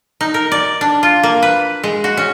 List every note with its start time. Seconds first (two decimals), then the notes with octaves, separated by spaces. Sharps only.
0.21 D#4
0.34 A#4
0.52 D5
0.81 D4
1.03 F4
1.23 A#3
1.43 B4
1.83 G#3
2.04 F#4
2.17 C#4